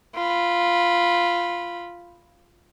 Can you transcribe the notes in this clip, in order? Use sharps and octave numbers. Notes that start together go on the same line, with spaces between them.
F4 B5